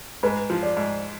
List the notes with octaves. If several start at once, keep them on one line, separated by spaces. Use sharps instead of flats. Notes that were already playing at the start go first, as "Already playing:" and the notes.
G#2 B4
F3
D5
G#2